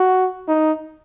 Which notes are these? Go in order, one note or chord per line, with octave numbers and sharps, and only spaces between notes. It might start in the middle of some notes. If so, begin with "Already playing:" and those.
Already playing: F#4
D#4